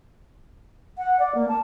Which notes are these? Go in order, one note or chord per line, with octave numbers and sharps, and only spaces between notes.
F#5
D5
A#3
A5